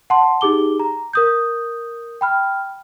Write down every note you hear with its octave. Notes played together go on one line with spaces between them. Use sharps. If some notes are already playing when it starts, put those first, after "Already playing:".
F#5 A5 C6
D#4 G4 G#4 D6 G7
A#5
A#4 D#6 G6
G5 B5 F6